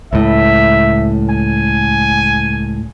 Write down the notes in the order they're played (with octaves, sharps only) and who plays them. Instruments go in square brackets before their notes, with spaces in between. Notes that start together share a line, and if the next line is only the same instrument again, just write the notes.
[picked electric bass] C#2 A2 [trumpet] E5
[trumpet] G#5